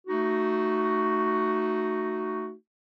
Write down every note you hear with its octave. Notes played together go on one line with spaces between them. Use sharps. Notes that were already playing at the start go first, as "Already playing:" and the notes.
A3 D#4 F#4